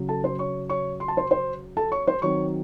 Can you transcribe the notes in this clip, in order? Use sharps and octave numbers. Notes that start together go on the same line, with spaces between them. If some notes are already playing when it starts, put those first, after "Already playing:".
Already playing: C#3 F#3
A4 A5
C5 C6
C#5 C#6
C#5 C#6
C6
A5
C5 C6
C5 C6
A4 A5
C#5 C#6
C5 C6
D#3 F#3 C4 C#5 C#6